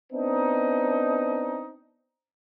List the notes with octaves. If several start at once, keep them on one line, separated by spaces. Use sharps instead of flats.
B3 C4 D4 D#4